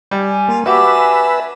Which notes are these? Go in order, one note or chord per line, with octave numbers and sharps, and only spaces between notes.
G3 G#5
A#3 F4
D4 F#4 G4 B4 D5 E5 D6